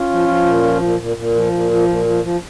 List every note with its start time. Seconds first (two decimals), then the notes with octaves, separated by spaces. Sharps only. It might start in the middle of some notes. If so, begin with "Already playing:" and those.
Already playing: C#4 F4
0.10 F3
0.28 F3
0.46 A#2
0.63 F3
0.82 A#2
0.99 A#2
1.17 A#2
1.35 F3
1.53 A#2
1.71 F3
1.88 A#2
2.05 F3
2.23 F3